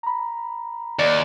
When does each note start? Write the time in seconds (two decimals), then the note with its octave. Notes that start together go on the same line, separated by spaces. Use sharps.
0.03 A#5 B5
0.99 D#2 D5